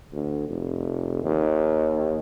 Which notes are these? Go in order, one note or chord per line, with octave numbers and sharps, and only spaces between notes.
D2
F1
D#2